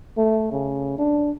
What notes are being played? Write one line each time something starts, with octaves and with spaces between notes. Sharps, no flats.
A3
C#3
D4